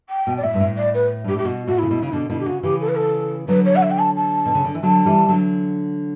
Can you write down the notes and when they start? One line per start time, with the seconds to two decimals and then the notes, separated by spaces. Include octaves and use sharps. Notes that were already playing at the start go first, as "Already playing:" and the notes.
0.09 G5
0.27 B2
0.37 D5
0.43 A2 E5
0.54 G2
0.60 A2
0.77 D5
0.94 B4
1.24 G2 G4
1.35 A2 G4
1.45 B2 F#4
1.67 A2 F#4
1.78 C#3 E4
1.91 B2
2.03 C#3 E4
2.12 B2 D3 D4
2.30 B2 D3 E4
2.39 G4
2.46 C#3 F#4
2.63 C#3 E3 G4
2.81 A4
2.88 B4
2.95 A4
3.48 D3 F#3 B4
3.65 C#5
3.76 F#5
3.82 E5
3.91 G5
3.99 A5
4.16 A5
4.46 B2
4.55 C#3
4.65 D3
4.75 E3
4.83 D3 F#3 A5
5.06 E3 G3
5.28 D3 F#3